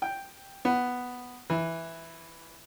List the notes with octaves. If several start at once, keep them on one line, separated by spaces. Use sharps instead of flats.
G5
B3
E3